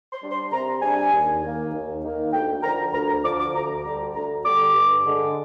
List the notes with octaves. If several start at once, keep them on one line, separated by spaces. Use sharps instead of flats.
C6
G3 D4
C6
C3 A#5
G3 D4 G#5
D#2
D#3 A#3
D#2
D#3 A#3
D2 G5
D3 F3 A#5
D2 A#5
A#5
D3 F3 D6
D6
D2 A#5
D3 G3 A#5
D2 A#5
D3 G3 D6
G2
D3 G#3